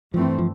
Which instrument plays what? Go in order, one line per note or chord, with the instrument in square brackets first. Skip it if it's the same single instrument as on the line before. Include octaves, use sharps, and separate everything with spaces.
[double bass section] G2 E3 A3 C4 [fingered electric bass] F3
[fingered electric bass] F3